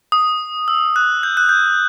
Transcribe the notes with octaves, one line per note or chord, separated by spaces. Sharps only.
D#6
E6
F#6
G6
F#6
G6